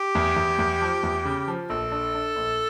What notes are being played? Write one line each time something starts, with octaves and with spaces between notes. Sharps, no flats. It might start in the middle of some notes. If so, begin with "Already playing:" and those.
Already playing: G4
E2
E2
E2
F3
E2
C#3
F3
A#1 A4
D4
D4
A#1